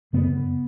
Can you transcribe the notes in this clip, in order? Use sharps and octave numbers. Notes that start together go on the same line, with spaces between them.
F#2 C#3 B3